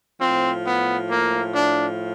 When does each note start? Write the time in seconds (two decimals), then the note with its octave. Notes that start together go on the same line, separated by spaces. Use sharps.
0.21 A2 F3 C4
0.66 B3
1.10 A#3
1.54 D4